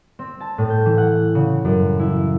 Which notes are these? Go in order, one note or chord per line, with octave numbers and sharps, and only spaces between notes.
C4
A5
A2
G6
E3
F#5
C#3
F#2
E4